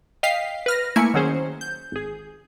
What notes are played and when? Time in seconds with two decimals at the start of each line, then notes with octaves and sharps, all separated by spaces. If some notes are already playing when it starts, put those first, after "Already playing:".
0.23 D#5 F5 G5 B6 C7
0.66 B4 F6 A#6
0.96 A3 A#3 E4 G#5 C#7
1.14 D#3 F#3 C#4 G#4 C5
1.61 G6
1.92 G#1 G#4